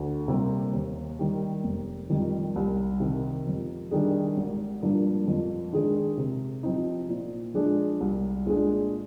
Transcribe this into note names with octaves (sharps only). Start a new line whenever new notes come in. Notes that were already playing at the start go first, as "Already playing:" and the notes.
Already playing: D2
C3 G3 A#3
D#2
D#3 G3
F1
F2 D#3 G3
C2
C3 D#3
F2
D#3 G3 D4 G#4
G#1
G2 F3 A#3 D4
F2
D#3 G#3 D4 G#4
C3
F3 C4 D#4
A#2
F3 G#3 D4 G#4
C2
A#2 G#3 D4 G#4